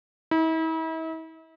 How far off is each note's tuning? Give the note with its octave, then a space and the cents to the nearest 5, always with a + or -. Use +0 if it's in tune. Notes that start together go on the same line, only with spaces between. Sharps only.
E4 -40